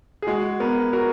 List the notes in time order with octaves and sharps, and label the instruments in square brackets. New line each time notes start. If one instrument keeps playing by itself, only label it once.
[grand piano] G#4
[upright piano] G#3 [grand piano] F#4
[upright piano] B3 [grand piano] A#4
[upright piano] F#4 [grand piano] A#4